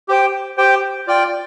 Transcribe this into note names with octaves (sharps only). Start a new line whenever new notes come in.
G4 C5 G5
G4 C5 G5
F4 D5 G5